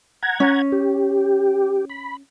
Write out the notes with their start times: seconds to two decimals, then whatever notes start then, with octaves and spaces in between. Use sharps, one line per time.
0.23 F#5 A#5 G#6
0.40 C#4
0.72 G4
1.89 B5